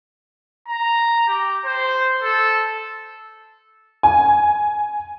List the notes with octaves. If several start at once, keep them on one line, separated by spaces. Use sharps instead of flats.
A#5
G4
C5
A4
G#5